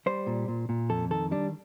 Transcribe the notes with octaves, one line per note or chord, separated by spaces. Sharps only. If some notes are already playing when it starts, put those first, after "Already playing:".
G3 C5
A#2
A#2
A#2
F2 A4
D#3 A4
G3 D4